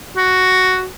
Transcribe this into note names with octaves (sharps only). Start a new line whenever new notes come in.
F#4